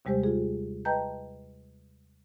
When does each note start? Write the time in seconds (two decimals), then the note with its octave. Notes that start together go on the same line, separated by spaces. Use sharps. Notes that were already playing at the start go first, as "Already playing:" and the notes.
0.05 D#2 C3 G3 G#3 G4 C5
0.24 F4 G#4
0.85 B4 D#5 G5 A5 A#5 G6